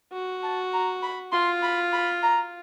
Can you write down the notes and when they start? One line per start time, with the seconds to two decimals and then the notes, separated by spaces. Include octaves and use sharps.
0.12 F#4
0.43 A5
0.73 A#5
1.03 B5
1.32 F4 C6
1.63 B5
1.93 B5
2.23 A#5